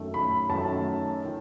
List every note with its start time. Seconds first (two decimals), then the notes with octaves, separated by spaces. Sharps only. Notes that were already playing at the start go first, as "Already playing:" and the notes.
Already playing: F#2 D#3 A3
0.14 B5
0.49 F#2 D#3 A3 A5
1.25 D#3